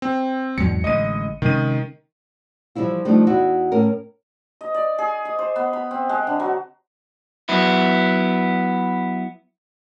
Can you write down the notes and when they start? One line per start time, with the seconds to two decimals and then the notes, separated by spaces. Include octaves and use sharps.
0.02 C4
0.58 E2 G#2 F#3 C#7
0.84 A1 D3 G#3 D#5 D#7
1.42 C3 D#3 G#3 C#4 D#7
2.75 E3 F3 G3 E4 F4
3.05 D#3 F3 G3 A3 D4 D#4
3.27 E2 D#4 E4 F#4
3.72 A2 C#4 A#4
4.61 D#5
4.75 D5
4.98 G#4
5.25 D#5
5.39 C5
5.56 B3
5.73 B5
5.91 C4
6.09 G#3
6.27 D3
6.40 F#3
7.49 F#3 B3 E4